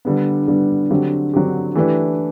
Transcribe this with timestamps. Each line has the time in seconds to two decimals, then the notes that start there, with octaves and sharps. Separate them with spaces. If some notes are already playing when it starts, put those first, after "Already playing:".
0.05 D3 G3 B3
0.48 D3 G3 B3
0.91 D3 F#3 C4 G4
1.34 D3 F#3 C4 G4
1.75 E3 A3 D4 G4 B4